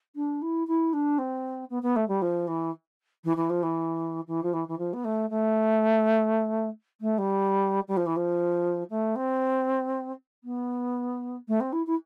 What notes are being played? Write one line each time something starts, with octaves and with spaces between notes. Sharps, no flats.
D4
E4
E4
D4
C4
B3
B3
A3
G3
F3
E3
E3
E3
F3
E3
E3
F3
E3
E3
F3
B3
A3
A3
A3
G3
G3
F3
E3
F3
A3
C4
B3
A3
C4
E4
E4